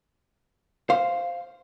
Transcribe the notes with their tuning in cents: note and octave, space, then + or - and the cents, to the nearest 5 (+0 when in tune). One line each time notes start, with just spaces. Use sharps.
C5 +0 F5 +0